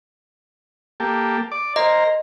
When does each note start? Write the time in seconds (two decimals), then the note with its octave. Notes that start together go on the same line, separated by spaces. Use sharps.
1.00 A#3 G4 A4
1.52 D5 D6
1.76 A#4 C5 D#5 A#5